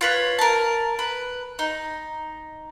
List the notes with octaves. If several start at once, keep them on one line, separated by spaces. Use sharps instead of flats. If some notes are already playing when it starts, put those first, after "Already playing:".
F4 B4 C#5
A#4 A5
B4
D#4